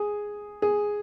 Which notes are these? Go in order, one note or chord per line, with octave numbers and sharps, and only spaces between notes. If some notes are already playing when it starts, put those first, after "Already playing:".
Already playing: G#4
G#4